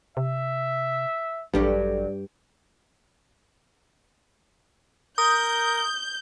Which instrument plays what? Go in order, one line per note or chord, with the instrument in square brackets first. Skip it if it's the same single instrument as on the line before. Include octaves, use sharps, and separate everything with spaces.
[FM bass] C3 [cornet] E5
[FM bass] A1 [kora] G2 G4 [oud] F#3 G3 A4
[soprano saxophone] A#4 [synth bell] D#6 [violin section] G6